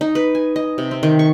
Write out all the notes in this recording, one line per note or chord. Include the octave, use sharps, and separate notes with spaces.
D#4
B4
G#5
D#5
C3
C4
D#3
C#6